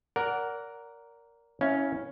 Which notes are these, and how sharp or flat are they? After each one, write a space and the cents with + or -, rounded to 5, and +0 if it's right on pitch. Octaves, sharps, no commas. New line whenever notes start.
A#4 +0 D5 -30 F#5 +0
C#4 +0 E4 -25 F5 +0